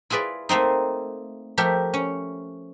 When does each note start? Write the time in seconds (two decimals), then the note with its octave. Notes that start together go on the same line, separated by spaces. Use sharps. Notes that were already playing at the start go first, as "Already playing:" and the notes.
0.10 E4 F4 G#4 B4 D5
0.49 A3 A#3 C4 D#4
1.58 F3 A3 G4 A#4 E5
1.94 C#4